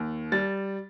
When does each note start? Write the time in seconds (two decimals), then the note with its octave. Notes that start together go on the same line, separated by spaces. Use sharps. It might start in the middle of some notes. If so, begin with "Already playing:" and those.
Already playing: D#2
0.32 G3 A6